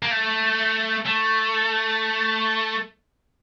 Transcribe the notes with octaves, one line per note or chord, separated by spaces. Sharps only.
A#3
A3
A3